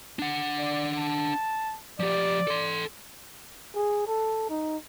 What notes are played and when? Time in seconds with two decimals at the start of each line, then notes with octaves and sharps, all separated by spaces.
0.19 D4 F#5
0.58 D5
0.98 A5
2.00 F3 G4 D5
2.47 A4 C6
3.75 G#4
4.07 A4
4.50 D#4